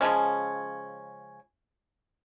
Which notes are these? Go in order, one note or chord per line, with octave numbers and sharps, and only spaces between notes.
C#3 F3 G#3 C#4